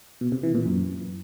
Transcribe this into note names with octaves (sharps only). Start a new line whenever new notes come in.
B2
C3
E3
A#2
F#2